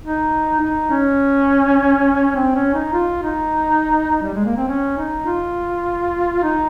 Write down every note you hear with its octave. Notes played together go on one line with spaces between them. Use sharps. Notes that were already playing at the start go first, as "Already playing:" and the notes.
D#4
D#4
C#4
C4
C#4
D#4
F4
D#4
G3
G#3
A#3
C4
C#4
D#4
F4
D#4